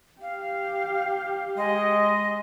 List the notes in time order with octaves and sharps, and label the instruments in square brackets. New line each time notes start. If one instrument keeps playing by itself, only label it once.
[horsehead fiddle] G4 [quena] F5
[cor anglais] G#3 [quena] D#5